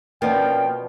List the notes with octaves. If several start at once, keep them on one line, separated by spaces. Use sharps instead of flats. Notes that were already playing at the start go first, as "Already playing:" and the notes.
B2 F3 A#3 C#4 D5 G5